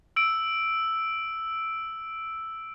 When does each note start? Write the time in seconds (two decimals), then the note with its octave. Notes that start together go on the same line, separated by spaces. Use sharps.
0.16 E6 D7